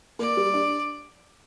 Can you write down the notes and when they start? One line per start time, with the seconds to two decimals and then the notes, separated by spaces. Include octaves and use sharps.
0.19 A#3 D5
0.37 G3
0.54 D4